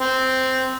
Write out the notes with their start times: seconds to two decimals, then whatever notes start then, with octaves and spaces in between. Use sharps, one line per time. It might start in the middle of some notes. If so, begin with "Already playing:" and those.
0.01 C4